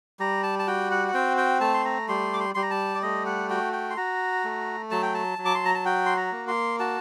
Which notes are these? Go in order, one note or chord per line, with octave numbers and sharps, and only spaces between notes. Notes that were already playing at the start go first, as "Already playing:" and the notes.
G3 A#5
A5
A5
F#4 G5
F#5
F#5
C4 G5
G5
A3 A5
C6
A#5
G3 C6
D6
C6
G3 C6
A#5
A5
D5
A3 D#5
F#5
F#4 G5
G5
C6
F#4 A#5
A3
F#3 A5
G5
A5
F#3
D6
C6
A#5
A5
F#4 G5
C6
A#5
A#3
C6
F#4 A5